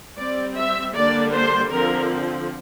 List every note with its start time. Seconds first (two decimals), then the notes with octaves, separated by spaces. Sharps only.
0.18 G3 C4 D5
0.57 E5
0.95 D3 G3 A#3 D4 D5
1.33 C5
1.71 D3 F3 C4 A#4